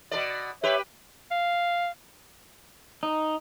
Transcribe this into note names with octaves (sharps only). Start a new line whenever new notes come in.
B2 A#4 D5
G4 B4 C#5 E5
F5
D#4